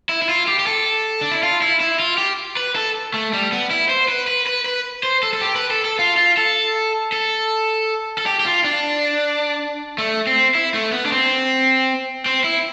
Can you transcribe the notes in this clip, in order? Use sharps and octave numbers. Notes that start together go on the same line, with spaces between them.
E4
E4
F4
G4
G4
A4
D4
E4
F4
E4
E4
F4
G4
B4
A4
A3
G3
B3
E4
C5
B4
B4
B4
B4
C5
A4
A4
G4
B4
A4
A4
F4
F4
A4
A4
A4
G4
G4
F4
D4
A3
C4
E4
A3
B3
D4
C4
C4
E4